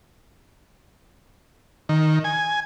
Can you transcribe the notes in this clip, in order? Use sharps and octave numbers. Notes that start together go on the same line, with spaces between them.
D#3
G#5